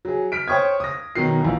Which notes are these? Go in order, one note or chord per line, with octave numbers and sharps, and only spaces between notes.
F#3 G#4
F6 B6 D7
C5 C#5 G5 C#6 D#6 G#6
D#6 A#6
B2 D#3 F#3 C7
A#1 E3